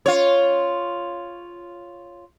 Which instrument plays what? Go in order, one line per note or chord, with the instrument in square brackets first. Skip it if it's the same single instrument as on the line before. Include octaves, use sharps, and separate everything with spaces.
[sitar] F4 C#5